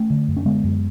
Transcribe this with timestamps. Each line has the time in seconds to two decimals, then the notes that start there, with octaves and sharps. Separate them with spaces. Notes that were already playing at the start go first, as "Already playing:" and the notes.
Already playing: A3 C#4
0.10 D3
0.28 F#2
0.36 C#4
0.45 D3 G#3 B3
0.64 F#2